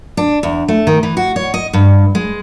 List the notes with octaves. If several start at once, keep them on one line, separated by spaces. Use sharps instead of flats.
D4
E2
A3
D#3
E3
F#4
C#5
D#5
G2
G#3